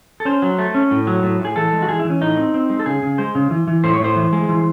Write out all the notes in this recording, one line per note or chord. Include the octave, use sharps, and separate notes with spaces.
A4
C#4 C5
F#3
A3
C#4
A2
F#3
A2
A2 G#4
E3 A4
G#3
F#4
E3 G#4
E4
E3
C#4
A2 D#4
C4
C4
G#3
A4
C#3 G#4
C#3
G#3 C5
C#3
E3
E3
A2 C5
C#5
A2 C5
E3
G#3
E3